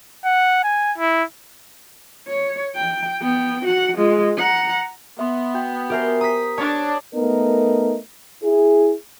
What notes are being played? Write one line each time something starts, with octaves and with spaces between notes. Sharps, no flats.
F#5
G#5
E4
C#5
G5
B3 G5
F#4 F#5
G#3 F4
F#5 A#5
B3 E5 C6
F#4 G5 G6
F#4 G4 A#4 C5 E5 G#5
A#5 D#6 B6
D4 C#5 A5
A3 B3 D#4 A#4
E4 G#4